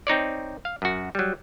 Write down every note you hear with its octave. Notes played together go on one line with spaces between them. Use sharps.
C4 D#4 C#5 D5
F5
F#2 F#4
F#3 G3